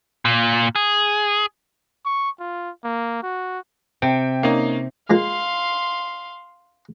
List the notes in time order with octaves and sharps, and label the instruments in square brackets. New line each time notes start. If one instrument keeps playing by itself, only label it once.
[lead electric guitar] A#2
G#4
[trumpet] C#6
F4
A#3
F#4
[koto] C3 [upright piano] G5
[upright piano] A#3 C#4 D#4
[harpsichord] G#3 A#3 F4 [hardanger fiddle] F5 C6